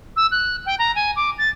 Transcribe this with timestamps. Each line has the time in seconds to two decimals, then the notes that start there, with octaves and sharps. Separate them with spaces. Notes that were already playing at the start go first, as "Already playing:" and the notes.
0.16 E6
0.31 F#6
0.65 G5
0.78 A#5
0.95 G#5
1.15 D6
1.38 A6